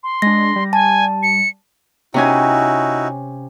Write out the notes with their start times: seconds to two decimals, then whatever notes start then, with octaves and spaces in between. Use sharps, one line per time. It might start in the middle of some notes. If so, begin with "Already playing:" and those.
0.03 C6
0.22 G#3 D4 A#6
0.56 G3
0.73 G#5 A5
1.23 C#7
2.14 C3 C#4 D#4 E4 F#4 G#5